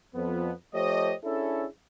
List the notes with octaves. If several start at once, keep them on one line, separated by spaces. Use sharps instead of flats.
F2 F3 B3
F3 A3 G4 C5 C#5 D#5
C#4 D4 E4 G#4 A4